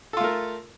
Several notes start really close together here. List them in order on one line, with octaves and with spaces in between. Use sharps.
A4 F4 A3 A#4